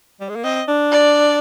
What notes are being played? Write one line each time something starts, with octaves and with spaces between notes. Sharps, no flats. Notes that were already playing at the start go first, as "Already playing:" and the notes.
G3
G#3
A#3
C4 D#5
D4
D5